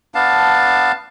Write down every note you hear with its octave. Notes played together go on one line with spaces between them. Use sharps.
B3 D4 F5 A5